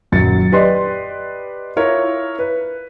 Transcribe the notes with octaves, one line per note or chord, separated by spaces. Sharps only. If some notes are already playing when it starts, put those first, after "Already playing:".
D#1 F#2 F#3 A6 C#7
G4 B4 D5 D#5 C6
E4 F4 A#4 C#5 E5
B4